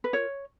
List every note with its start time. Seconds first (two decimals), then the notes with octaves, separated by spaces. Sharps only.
0.04 B4
0.13 F4 A#4 C#5